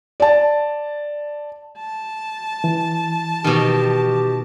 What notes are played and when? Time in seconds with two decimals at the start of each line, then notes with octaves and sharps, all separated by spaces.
0.20 D5 A5
1.79 A5
2.64 E3
3.44 B2 D#3 G4